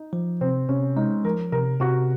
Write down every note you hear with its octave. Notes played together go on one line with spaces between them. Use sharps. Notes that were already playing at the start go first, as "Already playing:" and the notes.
Already playing: D#4
F3
C3 C4
C3 C#4
G#3 D#4
F3 A#4
C3 A#4
C3 F#4